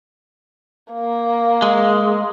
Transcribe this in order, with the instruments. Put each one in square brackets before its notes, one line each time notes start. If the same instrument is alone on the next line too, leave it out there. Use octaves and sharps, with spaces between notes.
[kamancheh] A#3
[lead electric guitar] G#3